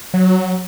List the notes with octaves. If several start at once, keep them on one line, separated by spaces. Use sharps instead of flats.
F#3